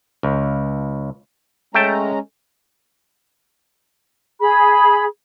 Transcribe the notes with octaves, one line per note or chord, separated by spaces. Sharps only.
C#2
G#3 A3 C#4 G5 A5 A#5
G#4 B5